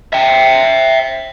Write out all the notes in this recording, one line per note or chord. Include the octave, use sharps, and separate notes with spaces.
E5 G5